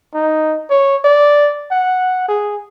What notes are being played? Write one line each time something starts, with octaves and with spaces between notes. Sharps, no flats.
D#4
C#5
D5
F#5
G#4